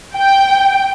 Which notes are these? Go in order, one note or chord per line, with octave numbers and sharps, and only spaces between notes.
G5